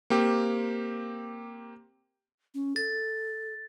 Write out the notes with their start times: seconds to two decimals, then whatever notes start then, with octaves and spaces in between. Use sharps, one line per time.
0.10 A#3 C4 G4
2.54 C#4
2.76 A4 A6